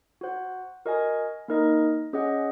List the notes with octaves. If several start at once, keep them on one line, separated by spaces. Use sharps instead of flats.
F#4 C5 F#5
F#4 A#4 D#5 G#5
A#3 D#4 A#4 D#5
C#4 G#4 D#5 F#5